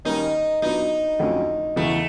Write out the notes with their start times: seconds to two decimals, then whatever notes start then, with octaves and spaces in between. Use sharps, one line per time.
0.05 D#3 G3 A#3 C#4 D#4
0.62 A#2 F#3 B3 D4 D#4
1.19 F2 D3 F#3 A3 C#4
1.76 E2 C#3 E3 A3